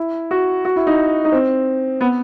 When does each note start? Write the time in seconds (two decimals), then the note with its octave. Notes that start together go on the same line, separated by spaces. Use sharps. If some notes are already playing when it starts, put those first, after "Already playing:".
Already playing: E4
0.31 F#4
0.65 F#4
0.76 E4
0.87 D#4
1.25 D#4
1.32 C4
2.01 B3